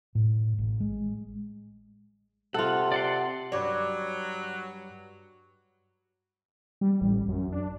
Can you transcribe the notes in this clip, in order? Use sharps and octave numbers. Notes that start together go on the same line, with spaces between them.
A2
A1
G#3
C3 F4 A4 F#5
D5 F#5 C6
G2 F#3 C#5 D5 D6
G3
A1
F#2
D4